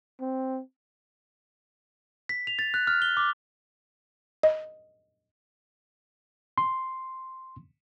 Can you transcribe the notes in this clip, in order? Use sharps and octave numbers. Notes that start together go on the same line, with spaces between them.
C4
B6
F7
A6
F#6
F6
G7
D6
D#5
C6